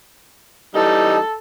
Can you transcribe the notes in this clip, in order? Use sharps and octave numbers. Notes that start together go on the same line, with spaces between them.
E3 G3 D#4 A4